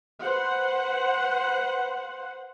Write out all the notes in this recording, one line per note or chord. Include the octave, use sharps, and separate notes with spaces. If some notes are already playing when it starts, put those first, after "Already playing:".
B4 C5 F#5